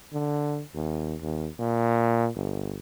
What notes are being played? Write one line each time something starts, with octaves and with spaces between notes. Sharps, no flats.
D3
D#2
D#2
A#2
G1